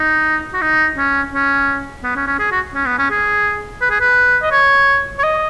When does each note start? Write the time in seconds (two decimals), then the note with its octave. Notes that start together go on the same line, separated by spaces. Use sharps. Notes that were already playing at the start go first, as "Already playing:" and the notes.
Already playing: D#4
0.54 F#4
0.62 D#4
0.97 C#4
1.33 C#4
2.04 B3
2.16 C#4
2.27 C#4
2.39 G#4
2.52 F#4
2.75 C#4
2.86 B3
2.98 C#4
3.11 G#4
3.82 B4
3.91 G#4
4.01 B4
4.42 D#5
4.52 C#5
5.19 C#5
5.23 D#5